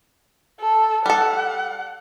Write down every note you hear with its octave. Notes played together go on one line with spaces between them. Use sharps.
A4
G3 A4 F#5